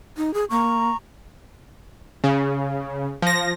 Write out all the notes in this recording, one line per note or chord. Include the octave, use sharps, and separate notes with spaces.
D#4
G#4
A#3 A#5 C#6
C#3
F3 A#6